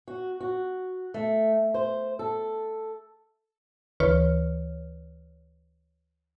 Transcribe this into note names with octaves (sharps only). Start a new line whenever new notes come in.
F#4
F#4
A3
C5
A4
D2 E3 B4 C#5 F6